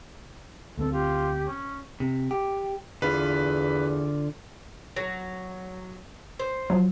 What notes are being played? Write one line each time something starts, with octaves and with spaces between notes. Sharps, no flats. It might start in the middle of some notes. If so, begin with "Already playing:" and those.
D2 G#3 C4 A4
F4 G4
C#4
C3
G4
E2 D3 F4 B4
F#3
C5
F3 F#3